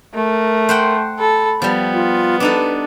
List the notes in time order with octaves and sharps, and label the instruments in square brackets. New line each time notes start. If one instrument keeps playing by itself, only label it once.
[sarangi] A3 [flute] A#4
[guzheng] C5 F#5 G5
[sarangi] A4 [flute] B5
[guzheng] F3 G3 [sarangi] B3
[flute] F4
[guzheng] D4 D#4 A4 [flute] B4